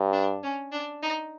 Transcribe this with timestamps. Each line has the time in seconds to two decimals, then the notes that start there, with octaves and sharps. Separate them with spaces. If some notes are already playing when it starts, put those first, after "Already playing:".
Already playing: G2
0.13 D4
0.43 C#4
0.72 D4
1.03 D#4